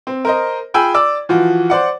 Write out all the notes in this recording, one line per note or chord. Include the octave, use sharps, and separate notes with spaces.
C4
A#4 C5 D#5
F4 G#4 G5 G#5 B5 E6
D5 D6 E6
E3 F3 F4 F#4
C5 D5 F#5